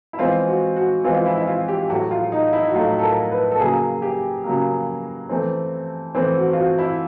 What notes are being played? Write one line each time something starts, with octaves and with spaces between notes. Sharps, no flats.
E4
E3 G#3 C4 F4
F#4
F#4
E3 G#3 C4 F4
F4
E4
E4
F4
G4
A2 F#3 A3 F#4
F4
D#4
E4
F#4
A2 F#3 A3 F4
A4
A#4
B4
A4
C#3 F#3 A#3 G#4
G4
C#3 F#3 A#3
E3 A3 C4
E3 A3 C4
F#4
F4
F#4
E4